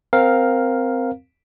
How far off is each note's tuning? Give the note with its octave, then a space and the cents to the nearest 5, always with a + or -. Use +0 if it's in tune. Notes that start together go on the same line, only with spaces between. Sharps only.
C4 -10 A#4 +0 F5 +10